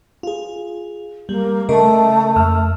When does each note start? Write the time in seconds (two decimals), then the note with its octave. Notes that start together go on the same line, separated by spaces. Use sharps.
0.23 F4 G#4
1.29 G3 A#3
1.69 C#3 A3 A#4 D#5
2.36 F2 E6 F6